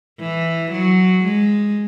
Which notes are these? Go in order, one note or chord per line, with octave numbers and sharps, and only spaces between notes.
E3
F#3
G#3